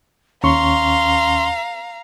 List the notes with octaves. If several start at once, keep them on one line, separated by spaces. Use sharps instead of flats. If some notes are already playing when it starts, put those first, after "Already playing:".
D#2 C#4 F5 A#5 C6 C#6